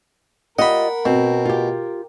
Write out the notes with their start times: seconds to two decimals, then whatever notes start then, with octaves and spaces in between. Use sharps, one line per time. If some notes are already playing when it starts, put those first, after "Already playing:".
0.59 F4 G4 A#4 D#5 F#5 B5
1.05 B2 C4
1.45 F4 G4